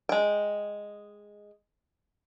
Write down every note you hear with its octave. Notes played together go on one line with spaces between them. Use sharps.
G#3 G5